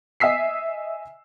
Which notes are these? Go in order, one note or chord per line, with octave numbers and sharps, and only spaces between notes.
D#5 E5 G#5 E6 B6 C7